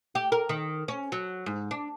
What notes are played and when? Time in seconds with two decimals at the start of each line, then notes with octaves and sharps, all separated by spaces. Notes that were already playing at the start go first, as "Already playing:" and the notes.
0.15 G4
0.32 A#4
0.49 D#3
0.88 C#4
1.12 F#3
1.46 G#2
1.71 D4